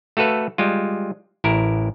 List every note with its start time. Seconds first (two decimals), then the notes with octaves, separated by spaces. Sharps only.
0.17 A3 F#4 A4 B4 F5
0.58 G3 G#3 F4
1.44 A1 E4 A#4